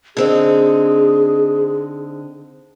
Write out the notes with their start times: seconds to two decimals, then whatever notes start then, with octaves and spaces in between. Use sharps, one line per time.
0.17 D3 C4 D#4 G#4